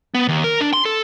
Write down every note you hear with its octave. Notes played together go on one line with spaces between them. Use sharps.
B3
D#2
A#4
D4
C6
A4